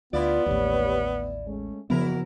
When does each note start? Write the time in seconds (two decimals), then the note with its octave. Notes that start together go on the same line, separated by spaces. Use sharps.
0.13 D2 B3 E4 F4 D5
0.46 A1 D#2 G4 B4 C#5
1.47 G#3 A3 C#4
1.90 F#1 E2 C#3 F3 B3 E4 F#4 A#4